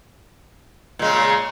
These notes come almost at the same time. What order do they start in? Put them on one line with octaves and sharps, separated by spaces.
A#2 G#3 C#3